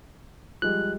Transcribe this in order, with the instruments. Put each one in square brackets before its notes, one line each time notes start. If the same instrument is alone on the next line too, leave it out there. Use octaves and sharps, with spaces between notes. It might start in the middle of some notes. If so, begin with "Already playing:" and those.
[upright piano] F3 G3 G#3 [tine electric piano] F#6